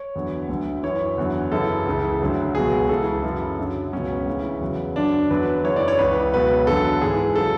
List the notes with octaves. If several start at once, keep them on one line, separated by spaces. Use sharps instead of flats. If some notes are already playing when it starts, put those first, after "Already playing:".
Already playing: C#5
E2 D3 F#3
D2 D3 F#3
F#2 E3 C#5
E2 D3 F#3
F#2 C#3 E3 A4
C#2 C#3 E3
D2 D3 F#3
C#2 B2 F#3 G#4
C#2 C#3 E3 A4
F#2 C#3 E3
F#2 D3 F#3
C#2 B2 F#3 C#4
D2 C#3 E3
E2 C#3 F#3
F#2 D3 F#3 D4
E2 D3 F#3 B4
F#2 C#3 E3 C#5
D5
C#5
C#2 C#3 E3 B4
C#2 B2 F#3 B4
E2 D3 F#3 A4
G#2 E3 G#4
C#3 F#3 A4